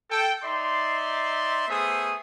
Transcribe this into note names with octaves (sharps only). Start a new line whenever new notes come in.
A4 G5
D#4 D5 E5 C6
A3 B3 G#4 C5 E5 D#6